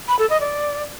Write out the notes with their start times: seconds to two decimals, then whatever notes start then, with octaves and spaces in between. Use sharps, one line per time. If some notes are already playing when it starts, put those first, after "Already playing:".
0.08 B5
0.19 A4
0.30 D#5
0.40 D5